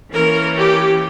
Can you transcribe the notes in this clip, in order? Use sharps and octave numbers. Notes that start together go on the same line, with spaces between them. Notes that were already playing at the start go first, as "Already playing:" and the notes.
E3 A#3 C#4 A#4
G4